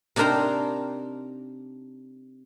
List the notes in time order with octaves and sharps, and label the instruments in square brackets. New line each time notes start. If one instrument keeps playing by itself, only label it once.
[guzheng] C3 D4 D#4 A#4 C5 A#5